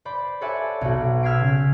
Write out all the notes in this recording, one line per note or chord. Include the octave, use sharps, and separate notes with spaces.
C5 D5 B5
A4 C#5 D5 E5 F#5 G#5
B1 B2 F#4
E6 F6 G#6 B6 C7 D7
C#3